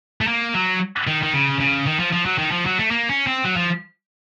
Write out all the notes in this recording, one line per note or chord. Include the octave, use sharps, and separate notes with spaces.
A3
A#3
F#3
D#3
D#3
C#3
C#3
D#3
F3
F3
F#3
D#3
F3
F#3
A3
A#3
C#4
C4
F#3
F3